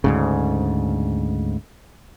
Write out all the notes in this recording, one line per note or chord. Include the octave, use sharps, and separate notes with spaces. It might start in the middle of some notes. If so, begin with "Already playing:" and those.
D2 G#2 C#3